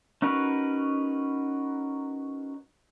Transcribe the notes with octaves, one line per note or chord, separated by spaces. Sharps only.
C#4 D#4 F#4 A#4 B4